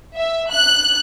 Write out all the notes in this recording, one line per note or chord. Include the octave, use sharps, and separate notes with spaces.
E5
F#6